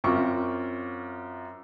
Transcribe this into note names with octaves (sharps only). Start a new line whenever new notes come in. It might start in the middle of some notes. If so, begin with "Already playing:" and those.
F#2 C4 F4 C#6 D6